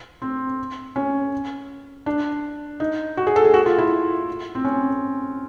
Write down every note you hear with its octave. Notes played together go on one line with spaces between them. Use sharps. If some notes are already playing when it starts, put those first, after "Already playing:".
C4
C#4
D4
D#4
F#4
G#4
A4
G#4
F#4
F4
E4
C4
C#4